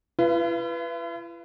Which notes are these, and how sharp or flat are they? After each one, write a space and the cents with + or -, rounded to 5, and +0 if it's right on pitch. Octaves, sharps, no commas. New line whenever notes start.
E4 +45 B4 +0 F5 -35